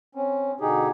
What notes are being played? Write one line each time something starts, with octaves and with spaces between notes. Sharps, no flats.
C4 C#4
B2 D3 D#4 G4 G#4